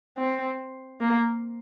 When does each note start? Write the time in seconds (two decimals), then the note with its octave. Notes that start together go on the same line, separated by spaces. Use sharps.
0.18 C4
1.00 A#3